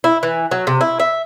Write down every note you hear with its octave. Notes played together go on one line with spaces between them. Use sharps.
E4
E3
F#3
C3
E4
E5